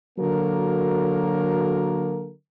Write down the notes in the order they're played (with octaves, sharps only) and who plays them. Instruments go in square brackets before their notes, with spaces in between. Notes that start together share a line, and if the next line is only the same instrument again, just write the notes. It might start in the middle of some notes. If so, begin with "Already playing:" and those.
[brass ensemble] D3 F#3 A#3 F#4 A4 A#4